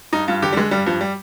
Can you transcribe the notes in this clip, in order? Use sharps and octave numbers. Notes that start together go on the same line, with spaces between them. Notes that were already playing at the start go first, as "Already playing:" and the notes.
G2 D#4
G2 F4
D3 G4
G3
D3 G#3
G2 G3
G2 F3
G3